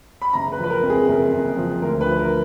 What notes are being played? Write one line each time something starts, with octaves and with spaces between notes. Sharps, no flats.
B5
F#1 A#5
B4
F3
B4
A#4
F2
G#4
F#1 A#4
F#1
F3
D2 A#4
B4
F3
A#4